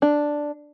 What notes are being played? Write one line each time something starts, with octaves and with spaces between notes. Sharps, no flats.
D4